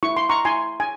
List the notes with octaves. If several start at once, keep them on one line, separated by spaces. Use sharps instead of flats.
E4 C#6
C6
A#5 C#6
E4 G#5 C6
G#5